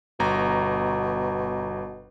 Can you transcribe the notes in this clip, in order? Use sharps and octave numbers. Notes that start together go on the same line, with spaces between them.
G1 B2 A#5